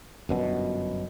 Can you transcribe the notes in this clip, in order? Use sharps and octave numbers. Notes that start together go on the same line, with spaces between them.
G1 F#2 B2